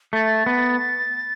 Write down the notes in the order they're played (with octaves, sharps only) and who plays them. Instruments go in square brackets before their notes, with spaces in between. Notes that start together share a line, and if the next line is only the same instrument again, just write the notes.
[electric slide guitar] A3 [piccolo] A6
[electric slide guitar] B3